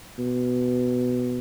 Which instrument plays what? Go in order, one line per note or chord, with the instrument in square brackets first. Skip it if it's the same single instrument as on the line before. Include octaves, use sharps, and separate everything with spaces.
[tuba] B2